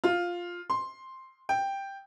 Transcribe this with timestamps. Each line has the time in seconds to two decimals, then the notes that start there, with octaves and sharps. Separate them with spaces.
0.04 F4
0.70 C6
1.49 G5